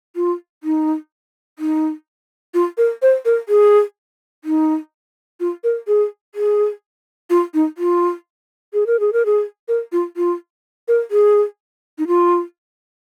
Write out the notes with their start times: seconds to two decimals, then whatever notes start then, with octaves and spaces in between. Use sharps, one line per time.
0.16 F4
0.63 D#4
1.59 D#4
2.54 F4
2.78 A#4
3.02 C5
3.25 A#4
3.49 G#4
4.44 D#4
5.40 F4
5.64 A#4
5.87 G#4
6.35 G#4
7.30 F4
7.54 D#4
7.78 F4
8.74 G#4
8.87 A#4
9.00 G#4
9.13 A#4
9.26 G#4
9.68 A#4
9.92 F4
10.17 F4
10.88 A#4
11.11 G#4
11.98 D#4
12.07 F4